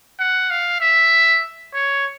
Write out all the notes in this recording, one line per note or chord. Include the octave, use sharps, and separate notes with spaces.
F#5
F5
E5
C#5